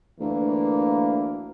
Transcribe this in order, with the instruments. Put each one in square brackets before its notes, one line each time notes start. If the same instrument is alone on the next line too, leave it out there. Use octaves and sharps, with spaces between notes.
[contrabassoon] D2 [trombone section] E3 A#3